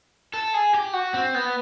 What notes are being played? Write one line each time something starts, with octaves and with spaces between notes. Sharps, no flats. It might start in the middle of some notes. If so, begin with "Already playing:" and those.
A4
G#4
G4
F#4
C4
B3